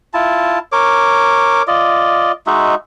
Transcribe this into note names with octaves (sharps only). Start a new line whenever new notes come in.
E4 F4 A5
A#4 C#5 D6
F4 D5 D#5
G#3 D#4 F#4 E5